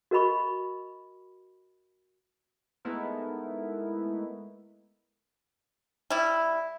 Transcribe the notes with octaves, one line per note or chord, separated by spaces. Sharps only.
F#4 A#4 D#5 B5 C#6
G#3 A3 B3 D#4 E4 A#4
G3 E4